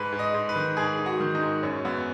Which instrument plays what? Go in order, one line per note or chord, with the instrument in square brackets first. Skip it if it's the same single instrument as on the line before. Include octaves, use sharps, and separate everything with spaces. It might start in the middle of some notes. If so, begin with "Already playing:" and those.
Already playing: [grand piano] G#2 B4
G#2
D#5
G#2
B4
D#3
G#2 G#4
G#2
F#4
D#3
D#4
G#2
F#2 C#4
F#2 B3